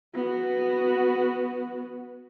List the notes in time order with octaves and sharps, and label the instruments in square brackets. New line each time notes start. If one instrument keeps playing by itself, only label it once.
[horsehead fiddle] B3 F#4